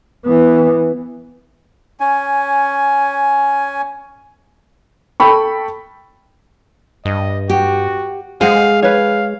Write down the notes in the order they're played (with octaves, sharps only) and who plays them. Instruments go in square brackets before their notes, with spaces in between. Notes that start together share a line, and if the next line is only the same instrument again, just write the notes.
[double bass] E3 B3
[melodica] C#4 G#5
[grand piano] A4 G5 B5 C#6
[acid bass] G2 [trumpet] D#5
[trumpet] F#4 [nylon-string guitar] G4
[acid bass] G#3 [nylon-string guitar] G#4 [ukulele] C5 F#5 [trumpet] F5
[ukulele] B4 C#5 [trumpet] F5